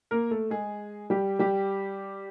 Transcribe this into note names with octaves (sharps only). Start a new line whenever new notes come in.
A#3 A#4
A3 A4
G#3 G#4
G3 G4
G3 G4